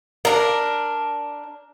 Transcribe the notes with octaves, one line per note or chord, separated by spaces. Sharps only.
D4 A#4